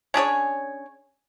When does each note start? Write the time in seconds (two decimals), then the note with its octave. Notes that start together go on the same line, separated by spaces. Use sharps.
0.14 C#4 D4 G#4 C#5